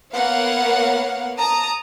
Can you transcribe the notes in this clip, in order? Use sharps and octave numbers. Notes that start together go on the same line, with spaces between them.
A#3 B3 C#5 F5 F#5
A5 A#5 D#6